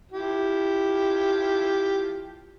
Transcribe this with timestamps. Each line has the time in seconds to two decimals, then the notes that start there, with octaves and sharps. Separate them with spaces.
0.12 F3 E4 G4